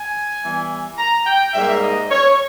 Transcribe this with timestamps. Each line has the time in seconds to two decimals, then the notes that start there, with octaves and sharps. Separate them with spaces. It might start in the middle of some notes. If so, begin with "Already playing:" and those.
Already playing: G#5
0.42 E3 G3 B3
0.98 A#5
1.26 G5
1.54 G#2 G3 A#3 E5
1.83 D#5
2.11 C#5